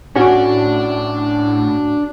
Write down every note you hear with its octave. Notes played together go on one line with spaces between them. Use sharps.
A2 C#4 D4 F#4